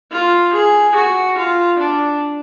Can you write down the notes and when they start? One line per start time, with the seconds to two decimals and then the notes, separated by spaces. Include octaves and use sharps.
0.12 F4
0.53 G#4
0.95 F#4
1.37 F4
1.79 D4